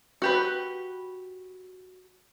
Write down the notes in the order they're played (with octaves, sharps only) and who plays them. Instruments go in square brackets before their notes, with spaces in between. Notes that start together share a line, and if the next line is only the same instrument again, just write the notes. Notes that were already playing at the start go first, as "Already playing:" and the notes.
[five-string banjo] F#4 G4 B4